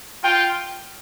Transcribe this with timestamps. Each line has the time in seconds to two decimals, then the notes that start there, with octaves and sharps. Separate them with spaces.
0.23 F4 G5